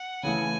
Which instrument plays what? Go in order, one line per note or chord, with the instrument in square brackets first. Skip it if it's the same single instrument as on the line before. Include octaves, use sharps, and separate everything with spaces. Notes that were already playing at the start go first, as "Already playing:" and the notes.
Already playing: [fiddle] F#5
[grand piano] C#3 E3 A3 [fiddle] G#5